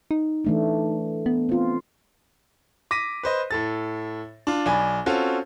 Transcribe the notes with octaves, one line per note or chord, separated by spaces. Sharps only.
D#4
E3 A3 D4
B3
C4 F4
D6 A#6 B6 D#7
B4 C5 D#5
A2 A4 A6
D4 F4
B1 D5 G#5 B5
C4 C#4 F4 F#4 A4